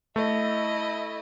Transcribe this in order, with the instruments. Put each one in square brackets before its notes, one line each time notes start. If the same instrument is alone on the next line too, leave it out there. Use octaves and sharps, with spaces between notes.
[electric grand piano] A3 [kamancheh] E4 D#5